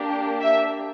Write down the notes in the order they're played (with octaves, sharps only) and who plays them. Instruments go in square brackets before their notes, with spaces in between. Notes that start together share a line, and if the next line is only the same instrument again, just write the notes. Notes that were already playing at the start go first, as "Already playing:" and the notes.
Already playing: [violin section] A#3 D4 G4
E5